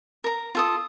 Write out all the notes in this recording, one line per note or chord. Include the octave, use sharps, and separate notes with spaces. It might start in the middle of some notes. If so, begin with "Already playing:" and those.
A#4 A#5
F4 A4 D#6